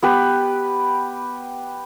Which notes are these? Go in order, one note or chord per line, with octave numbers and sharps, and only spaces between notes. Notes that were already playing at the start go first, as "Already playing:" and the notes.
B3 G4 B4